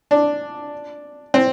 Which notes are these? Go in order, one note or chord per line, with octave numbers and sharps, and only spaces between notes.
D4
C4